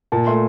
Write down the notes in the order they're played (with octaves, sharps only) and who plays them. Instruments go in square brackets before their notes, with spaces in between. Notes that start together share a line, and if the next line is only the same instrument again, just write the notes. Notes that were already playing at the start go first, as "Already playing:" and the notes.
[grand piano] A#2 A5
A3 C6